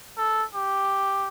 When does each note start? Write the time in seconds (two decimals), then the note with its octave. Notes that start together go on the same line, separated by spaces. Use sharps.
0.17 A4
0.54 G4